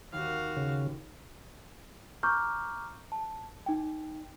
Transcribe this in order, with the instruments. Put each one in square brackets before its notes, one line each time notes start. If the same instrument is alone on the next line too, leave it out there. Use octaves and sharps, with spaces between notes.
[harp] D#2 [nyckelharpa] F#4 F5
[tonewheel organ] C#3
[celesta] A#5 C#6 D6 F6 G6
A5
D#4 G5